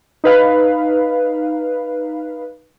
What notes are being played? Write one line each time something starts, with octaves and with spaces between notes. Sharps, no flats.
D#4 B4 F5